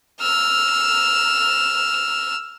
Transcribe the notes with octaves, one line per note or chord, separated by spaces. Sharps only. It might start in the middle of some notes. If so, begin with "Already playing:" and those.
E6 F6